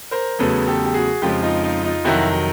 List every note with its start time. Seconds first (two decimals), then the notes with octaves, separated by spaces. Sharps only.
0.11 A#4 C5
0.39 E2 C#3 F#3 A3 A4 B4
0.67 G4 A4
0.85 G4
0.94 F#4 G#4
1.22 F2 C#3 F3 G#3 F4 G4
1.42 D#4 F4
1.64 D#4 F4
1.84 D#4 F4
2.04 F2 C3 D#3 F#3 E4 F#4